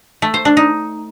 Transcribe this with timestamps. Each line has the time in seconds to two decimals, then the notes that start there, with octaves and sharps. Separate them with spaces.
0.22 A3
0.34 C5
0.45 D4
0.57 D#4